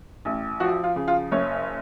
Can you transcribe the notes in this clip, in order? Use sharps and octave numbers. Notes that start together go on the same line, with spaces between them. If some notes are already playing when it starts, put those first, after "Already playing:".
A1
F3 F#4
F4
C#3
F4
F#1 C#5